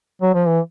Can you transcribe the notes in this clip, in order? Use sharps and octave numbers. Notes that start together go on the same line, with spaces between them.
F#3
F3
E3